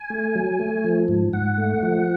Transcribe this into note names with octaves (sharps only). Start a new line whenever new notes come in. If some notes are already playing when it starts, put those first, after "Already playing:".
Already playing: G#5
A3
F#3
A3
F3
G#2
G#2 F#5
A3
F3